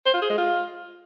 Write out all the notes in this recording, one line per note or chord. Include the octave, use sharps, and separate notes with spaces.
C5
F4
G#4
G#3
F4